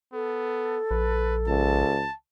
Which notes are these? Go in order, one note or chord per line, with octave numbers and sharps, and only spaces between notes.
B3 A4
A#1 B4
C#2 A5